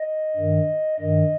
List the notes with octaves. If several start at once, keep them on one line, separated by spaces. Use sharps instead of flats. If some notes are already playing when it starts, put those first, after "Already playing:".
Already playing: D#5
G2 D#3
G2 D#3 D#5